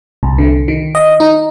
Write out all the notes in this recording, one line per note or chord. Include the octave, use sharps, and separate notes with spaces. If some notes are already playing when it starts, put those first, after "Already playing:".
C2
D3
D#3
D#5
D#4